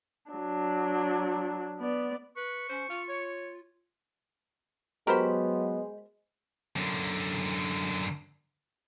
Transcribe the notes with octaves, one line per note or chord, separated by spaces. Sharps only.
F#3 D4
B3 D5
B4 C#6
C#4 C5
F4 F5
C#5
F#3 G#3 B3 F#4 G4 A#4 C5 B5
F#2 D3